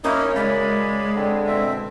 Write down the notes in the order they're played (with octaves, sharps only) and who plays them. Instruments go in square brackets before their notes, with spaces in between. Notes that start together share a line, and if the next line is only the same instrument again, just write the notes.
[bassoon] F#2 [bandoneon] A#3 D#4 E4 [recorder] C#4 [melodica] D#5
[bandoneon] C#3 [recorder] G#3 [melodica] D5 B5
[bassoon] D3 [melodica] C4
[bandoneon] B2 C4 [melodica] E5